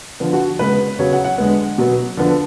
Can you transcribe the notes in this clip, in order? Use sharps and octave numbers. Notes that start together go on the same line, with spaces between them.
D3 F3 B3
F#4
C#3 G#3 B3 B4
C#3 F#3 B3 C#5
F#5
F#5
D3 G#3 B3
B2 F#3 B3
D3 F3 B3